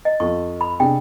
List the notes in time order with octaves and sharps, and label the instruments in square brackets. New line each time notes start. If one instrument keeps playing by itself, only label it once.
[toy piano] D#5
[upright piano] F2 [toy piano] C#6
[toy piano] B5
[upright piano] C3 D4 G#4 [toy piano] G5